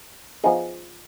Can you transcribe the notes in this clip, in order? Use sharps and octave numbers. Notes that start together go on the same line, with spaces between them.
F3 B3 D#4 G#4